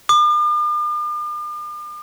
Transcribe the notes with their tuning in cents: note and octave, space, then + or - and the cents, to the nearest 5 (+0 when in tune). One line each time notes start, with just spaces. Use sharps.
D6 +45